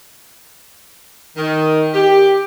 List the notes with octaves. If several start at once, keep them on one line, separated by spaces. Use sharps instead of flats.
D#3
G4